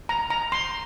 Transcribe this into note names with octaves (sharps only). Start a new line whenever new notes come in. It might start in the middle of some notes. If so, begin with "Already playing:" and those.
A#5
A#5
C6